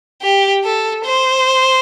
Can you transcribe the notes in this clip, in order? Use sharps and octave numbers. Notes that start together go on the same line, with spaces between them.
G4
A4
C5